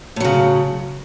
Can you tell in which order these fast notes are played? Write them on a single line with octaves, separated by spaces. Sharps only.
A2 F#3 C#3